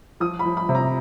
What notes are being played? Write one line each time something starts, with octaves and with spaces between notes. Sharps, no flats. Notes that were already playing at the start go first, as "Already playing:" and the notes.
F3 D#6
B5
F3
B5
C3
A#5